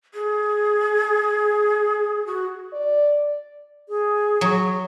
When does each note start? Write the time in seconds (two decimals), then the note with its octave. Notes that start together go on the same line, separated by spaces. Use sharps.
0.14 G#4
2.27 F#4
2.73 D5
3.89 G#4
4.41 F#3